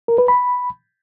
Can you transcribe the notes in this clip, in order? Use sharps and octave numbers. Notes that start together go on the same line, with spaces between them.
A#4
B4
B5